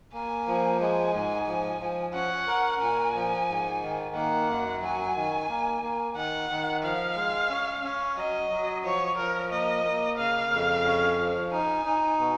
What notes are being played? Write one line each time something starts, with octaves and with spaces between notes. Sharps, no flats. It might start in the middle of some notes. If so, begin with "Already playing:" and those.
A#3 G#5
F3
G#3 G#5
G#2
F3
F3
C#4 F#5
A#4
A#2 G#5
F3
G#2
D#3
A#3 F#5
F#2
F#3 G#5
D#3
A#3
A#3
D#3 F#5
D#3
F3 F5
G#3
C#4
C#4
F#3 D#5
F#3
F3 C#5
F3 A#4
A#3 D#5
A#3
C#3 F5
F2
C#4
F3
D#4 G#5
D#4
B2